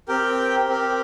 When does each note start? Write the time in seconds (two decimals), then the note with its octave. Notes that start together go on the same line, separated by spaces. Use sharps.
0.08 C4 G4 A#4 G5
0.68 C4 G4 A#4